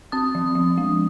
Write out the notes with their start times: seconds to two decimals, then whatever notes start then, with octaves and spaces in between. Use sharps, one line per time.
0.12 C4 D#6
0.35 F3
0.55 F3
0.77 G#3